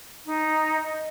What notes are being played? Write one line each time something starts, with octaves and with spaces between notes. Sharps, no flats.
D#4
D#5